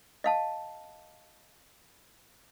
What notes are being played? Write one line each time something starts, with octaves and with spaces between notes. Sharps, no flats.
D#5 F5 A5